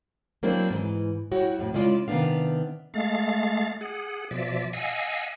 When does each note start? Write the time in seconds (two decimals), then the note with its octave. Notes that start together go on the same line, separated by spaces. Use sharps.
0.43 F#3 A#3 C4 D4 E4
0.71 G#2 E3
1.32 G3 E4 F#4 C#5
1.59 F2 A2
1.74 C#3 G#3 C#4 E4 F4 D5
2.08 C3 D#3 A#3 B3 D4 F5
2.94 G#3 A3 F5 A6
3.81 G#4 F#5
4.31 B2 F3 D5 E5
4.73 D#5 F5 F#5 G#5 E6